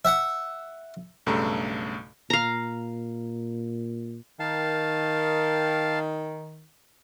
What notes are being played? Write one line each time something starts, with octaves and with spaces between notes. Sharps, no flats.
E5 F#5
B1 G2 C#3 A3 A4 A#5
A#2 F5 A#5
D#3 F5 A5